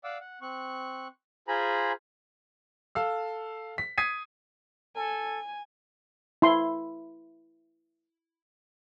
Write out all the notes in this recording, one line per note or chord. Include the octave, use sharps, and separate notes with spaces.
D5 F5 F#5 D6 E6
F#5
C4 C#6 F#6
F4 G#4 C5 G#5 A#5 B5
A4 F5 E6
B6
D#6 G#6 B6 C7 D#7
A4 G#5
E4 C6